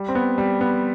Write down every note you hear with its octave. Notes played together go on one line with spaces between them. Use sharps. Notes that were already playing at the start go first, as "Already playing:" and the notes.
Already playing: G3
C4
B3
G3
B3